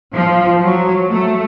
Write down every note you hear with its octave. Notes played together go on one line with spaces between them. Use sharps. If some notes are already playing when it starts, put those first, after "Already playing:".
F3
F#3
A3